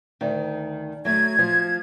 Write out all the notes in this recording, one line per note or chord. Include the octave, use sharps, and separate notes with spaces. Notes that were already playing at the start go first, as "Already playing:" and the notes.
D2 D#3
F#3 A3 G#6
F3